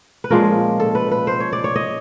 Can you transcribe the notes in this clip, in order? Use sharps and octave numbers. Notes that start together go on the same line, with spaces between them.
B4
A#2 F3 G#3 C#4 A#4
A4
B4
B4
C5
C#5
D5
C#5
D#5